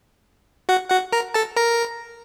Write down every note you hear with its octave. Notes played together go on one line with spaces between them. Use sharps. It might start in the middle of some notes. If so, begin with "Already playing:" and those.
F#4 F#5
F#4 F#5
A#4 A#5
A4 A5
A#4 A#5